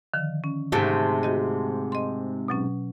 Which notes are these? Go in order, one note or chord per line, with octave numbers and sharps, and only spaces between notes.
D3 D#3 F3
C#4
G#2 C3 A3
F#4 G4 D#5
D#5 C6
B2 F#3 C#4